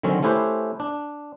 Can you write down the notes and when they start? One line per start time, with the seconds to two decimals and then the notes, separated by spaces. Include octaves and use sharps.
0.03 D3 D#3 F#3 C4 C#4
0.23 A3 C#4 E4 G4 B4 C5
0.80 D4